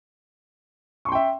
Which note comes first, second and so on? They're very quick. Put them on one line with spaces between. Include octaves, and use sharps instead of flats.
C#6 C6 G5 E5